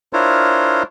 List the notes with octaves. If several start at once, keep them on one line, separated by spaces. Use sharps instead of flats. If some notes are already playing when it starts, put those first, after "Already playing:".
D4 E4 F4 A#4 C5 C#5